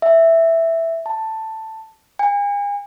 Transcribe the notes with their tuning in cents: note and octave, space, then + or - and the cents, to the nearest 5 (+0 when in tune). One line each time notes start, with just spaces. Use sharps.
E5 +0
A5 +5
G#5 -40